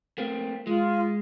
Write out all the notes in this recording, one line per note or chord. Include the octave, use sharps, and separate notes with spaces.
A3 A#3 C4
G#3 F4